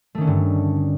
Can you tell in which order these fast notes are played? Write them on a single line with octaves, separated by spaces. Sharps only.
A3 D#3 C#4 D3 G2